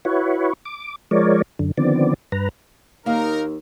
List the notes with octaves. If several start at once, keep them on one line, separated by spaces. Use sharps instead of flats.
E4 F#4 B4 C#5
D6
F3 G#3 A#4 C#5 D5
F#2 D3
D3 D#3 F3 B3 C4 D5
G2 B4 A#5
D#2 A#3 D#4 A#4 F5